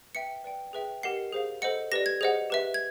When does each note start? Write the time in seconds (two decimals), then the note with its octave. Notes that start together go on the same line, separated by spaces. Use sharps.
0.15 B4 E5 G5 C#7
0.44 B4 D5 G5
0.73 G#4 B4 E5 G5
1.03 G4 A#4 D#5 F#5 C7
1.32 G#4 C5 F5
1.62 A4 C5 D#5 F#5 C#7
1.92 G4 B4 D5 A#6
2.06 G#6
2.21 G#4 C5 D#5 F#5
2.50 G4 B4 E5
2.74 G#6